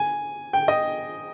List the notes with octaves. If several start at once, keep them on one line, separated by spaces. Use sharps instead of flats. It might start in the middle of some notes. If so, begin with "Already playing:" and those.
Already playing: G#5
G5
D#5